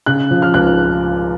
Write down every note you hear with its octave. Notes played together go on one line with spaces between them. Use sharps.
C#3 F#6
F3
F6
C#2 F#6